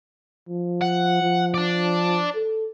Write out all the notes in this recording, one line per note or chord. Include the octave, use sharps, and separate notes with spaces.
F3
F#5
F3
D5 A5
A4